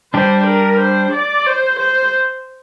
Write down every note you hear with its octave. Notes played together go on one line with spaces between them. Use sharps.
G3 D4 G4 C5
A#4
C5
D5
C5
C5